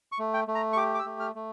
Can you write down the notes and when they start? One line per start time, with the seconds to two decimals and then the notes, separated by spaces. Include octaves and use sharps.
0.12 C#6
0.19 A3
0.34 G5
0.48 A3
0.55 A#5
0.73 C#6
0.77 G4 D6
0.94 D6
0.99 E6
1.06 A3
1.20 F6
1.35 A3